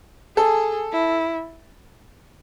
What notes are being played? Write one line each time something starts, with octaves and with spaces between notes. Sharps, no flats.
G#4 A4
E4